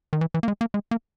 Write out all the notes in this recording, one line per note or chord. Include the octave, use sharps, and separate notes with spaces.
D#3
E3
E3
A#3
G#3
A#3
G#3
A#3